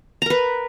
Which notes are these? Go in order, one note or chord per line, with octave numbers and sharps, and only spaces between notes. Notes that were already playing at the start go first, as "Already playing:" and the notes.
A#4 B4 A#5